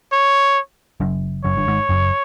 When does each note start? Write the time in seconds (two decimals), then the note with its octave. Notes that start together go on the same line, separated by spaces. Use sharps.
0.12 C#5
1.00 F#1 F#2
1.44 F#1 F#2 C#5
1.57 G1 G2
1.68 G#1 G#2
1.89 F#1 F#2